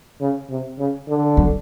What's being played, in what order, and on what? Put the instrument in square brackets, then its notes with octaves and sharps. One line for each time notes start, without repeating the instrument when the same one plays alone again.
[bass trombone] C#3
C3
C#3
D3
[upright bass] F#3